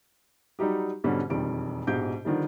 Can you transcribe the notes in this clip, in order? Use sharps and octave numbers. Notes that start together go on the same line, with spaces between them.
F#3 G3 D#4 G4
G#2 B2 D3 G3 C#4
E1 F2 D#3 G3 D7
A#1 G#2 B2 G4 G6 D7
D3 D#3 F3 G3